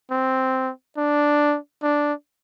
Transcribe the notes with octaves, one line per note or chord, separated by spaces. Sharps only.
C4
D4
D4